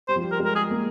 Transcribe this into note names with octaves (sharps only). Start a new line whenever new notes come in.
G3 C5
F3
G3
A#4
G#3
A#4
G#4
A#3